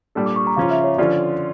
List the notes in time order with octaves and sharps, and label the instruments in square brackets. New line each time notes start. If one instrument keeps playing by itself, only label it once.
[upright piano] A#2 G3 D4 A4
[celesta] D6
C#6
A#5
[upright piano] C#3 F3 C#4 F4 [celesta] F5
[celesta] E5
C#5
[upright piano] D3 F3 C#4 F4 [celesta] D5